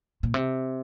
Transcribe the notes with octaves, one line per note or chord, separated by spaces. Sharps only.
A#2
C3